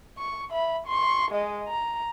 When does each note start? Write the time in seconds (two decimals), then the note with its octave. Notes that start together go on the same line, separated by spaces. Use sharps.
0.18 C#6
0.50 E5 B5
0.87 C6 C#6
1.31 G#3 D#5
1.67 A#5